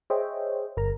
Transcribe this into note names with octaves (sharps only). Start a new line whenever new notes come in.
G#4 C5 C#5 D#5 E5 G5
G1 A#4 A#5